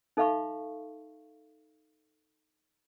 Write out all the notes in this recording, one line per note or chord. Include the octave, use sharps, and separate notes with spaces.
D#4 A4 E5 F5 B5 C#6